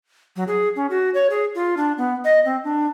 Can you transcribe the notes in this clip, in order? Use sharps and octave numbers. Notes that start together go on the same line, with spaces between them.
F#3
G#4
C#4
F#4
C#5
G#4
F4
D4
B3
D#5
C4
D4